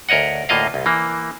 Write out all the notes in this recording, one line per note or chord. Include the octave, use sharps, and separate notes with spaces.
D2 A#4 C#5 D#5 F#5
D2 A2 A#3 F4 D#5 F5
C2
E3 A#3